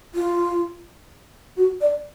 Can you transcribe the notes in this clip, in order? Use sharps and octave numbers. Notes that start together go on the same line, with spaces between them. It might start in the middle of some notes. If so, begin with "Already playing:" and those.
F4
F#4
D5